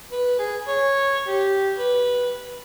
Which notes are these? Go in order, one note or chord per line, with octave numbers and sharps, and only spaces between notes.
B4
G#4
C#5
G4
B4